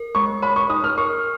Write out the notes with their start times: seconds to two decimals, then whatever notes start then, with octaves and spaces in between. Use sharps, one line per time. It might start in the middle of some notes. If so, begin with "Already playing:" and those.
Already playing: A#4
0.15 G#3 C#6
0.42 C#5 B5
0.56 C#6
0.70 D#4 D#6
0.84 F6
0.98 A#4 C#6